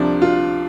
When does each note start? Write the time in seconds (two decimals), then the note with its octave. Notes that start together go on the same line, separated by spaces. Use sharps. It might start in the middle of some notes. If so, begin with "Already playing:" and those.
Already playing: C2 C3 F3 D4
0.22 F4